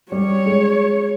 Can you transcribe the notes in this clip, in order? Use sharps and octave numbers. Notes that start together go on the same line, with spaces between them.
G3 G4 C#5
G#3